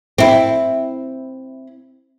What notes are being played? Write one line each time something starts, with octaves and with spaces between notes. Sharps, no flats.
C4 E4